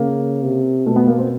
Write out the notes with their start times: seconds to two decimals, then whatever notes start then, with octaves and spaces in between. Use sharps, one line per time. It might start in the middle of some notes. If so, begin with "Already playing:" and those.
Already playing: C#3 A#3
0.43 C3
0.86 B2 A3
0.96 B3
1.07 A#3
1.18 C4